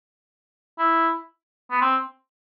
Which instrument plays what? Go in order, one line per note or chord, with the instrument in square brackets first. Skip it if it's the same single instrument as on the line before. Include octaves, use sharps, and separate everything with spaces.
[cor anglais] E4
B3
C4